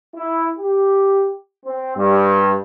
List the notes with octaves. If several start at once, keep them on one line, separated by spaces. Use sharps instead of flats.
E4
G4
C4
G2